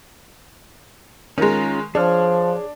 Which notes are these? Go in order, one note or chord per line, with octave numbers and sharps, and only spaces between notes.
D#3 G#3 C#4 F4 A#5
F3 D4 G#4 C#5 F6